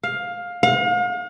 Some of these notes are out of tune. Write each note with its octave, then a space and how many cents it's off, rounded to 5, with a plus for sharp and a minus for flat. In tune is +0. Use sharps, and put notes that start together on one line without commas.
F5 +15
F5 +40